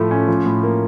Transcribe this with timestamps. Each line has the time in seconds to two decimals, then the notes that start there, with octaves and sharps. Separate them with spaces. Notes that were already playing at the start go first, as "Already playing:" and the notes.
Already playing: A2 F3 A3
0.11 C#4
0.28 F3
0.46 A2
0.63 A#3